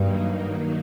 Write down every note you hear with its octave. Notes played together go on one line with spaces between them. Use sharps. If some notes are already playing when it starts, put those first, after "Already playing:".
Already playing: G2 D#3 F#3 A#3 D#4